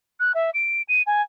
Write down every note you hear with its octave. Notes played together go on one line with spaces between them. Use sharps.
F#6
E5
D7
D#7
G#5